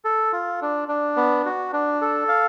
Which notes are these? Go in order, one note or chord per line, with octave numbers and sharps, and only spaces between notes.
A4
F4
D4
D4
B3
F#4
D4
A4
F5